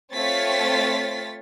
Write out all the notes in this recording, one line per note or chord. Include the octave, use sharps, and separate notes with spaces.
A3 C4 F4 C#5 A6 B6